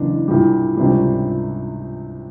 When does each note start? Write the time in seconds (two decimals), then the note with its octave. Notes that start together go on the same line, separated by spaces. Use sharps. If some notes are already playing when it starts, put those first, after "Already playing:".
Already playing: F#1 E2 C#3 D4
0.28 C2 A#2 G3
0.77 C#2 C3 D#3 G3 D4
0.86 C#4
0.95 D4